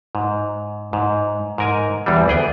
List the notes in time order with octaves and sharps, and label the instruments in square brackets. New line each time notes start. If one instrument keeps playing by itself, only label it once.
[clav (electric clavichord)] G#2
G#2
G#2 A#4 G#5
E2 E3 G3
D2 B3 G#4 G5